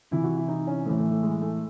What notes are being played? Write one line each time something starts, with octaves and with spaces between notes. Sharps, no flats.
C3 E3 E4
F#4
E4
D#4
C#4
A2 E3 C4
A3
A3
G#3
A3